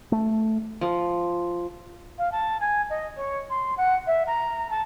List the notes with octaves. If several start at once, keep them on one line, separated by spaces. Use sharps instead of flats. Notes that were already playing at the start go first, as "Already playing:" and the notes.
A3
F3
F5
A5
G#5
D#5
C#5
C6
F#5
E5
A#5
A5